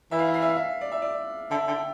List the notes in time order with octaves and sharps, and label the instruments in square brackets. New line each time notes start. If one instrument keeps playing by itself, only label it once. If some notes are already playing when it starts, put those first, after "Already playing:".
[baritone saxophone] E3 [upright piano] E5
[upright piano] F5
E5
F5
E5
F5
E5
D5
E5
D5
[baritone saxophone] D3 [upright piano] E5
[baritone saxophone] D3 [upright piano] G5